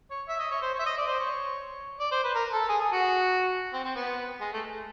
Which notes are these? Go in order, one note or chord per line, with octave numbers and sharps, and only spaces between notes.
C#5
E5
D#5
C#5
C5
C#5
E5
D#5
D5
C5
C#5
D5
C5
B4
A#4
A4
G#4
G#4
F#4
C4
C4
B3
G#3
A3